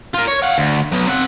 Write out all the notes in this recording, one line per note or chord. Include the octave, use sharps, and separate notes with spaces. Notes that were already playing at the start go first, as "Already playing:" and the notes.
F4 A#4
C#5
F5 F#5
D2
F#3 B3
C4 F#5